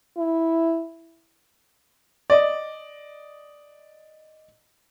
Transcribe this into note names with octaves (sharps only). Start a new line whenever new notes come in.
E4
D5 D#5